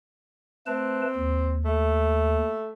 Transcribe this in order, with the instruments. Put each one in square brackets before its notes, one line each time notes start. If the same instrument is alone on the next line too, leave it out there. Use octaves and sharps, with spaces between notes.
[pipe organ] A3 B4 A5 [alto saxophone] C4
[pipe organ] D#2
[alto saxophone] A3